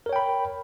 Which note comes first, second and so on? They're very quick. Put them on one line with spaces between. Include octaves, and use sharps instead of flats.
A#4 C#5 G5 B5